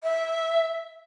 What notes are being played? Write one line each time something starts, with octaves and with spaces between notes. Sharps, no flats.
E5